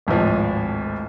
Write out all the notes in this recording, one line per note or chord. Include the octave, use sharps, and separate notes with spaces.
D1 G#1 A2 F3